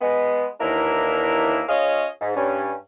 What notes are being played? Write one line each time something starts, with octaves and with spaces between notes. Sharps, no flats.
G#3 B3
D#2 E3 A#3 D4 E4 A#4
C#4 F4 G#4 C#5 D#5 F5
G#2
G2 G3 C#4